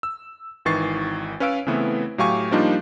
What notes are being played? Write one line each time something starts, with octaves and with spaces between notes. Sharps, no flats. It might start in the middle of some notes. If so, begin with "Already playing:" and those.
E6
G#1 D#3 E3 C#6 A6 C7
C#4 B4 C#5 F5 E6 D7
C#3 E3 A3 B3 C4 E4
A2 F#3 G4 F5 G#5 C#6
F3 G3 A#3 D4 D#4 F4